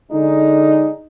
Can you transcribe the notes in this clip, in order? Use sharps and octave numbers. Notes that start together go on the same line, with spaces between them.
D3 G#3 D4 D#4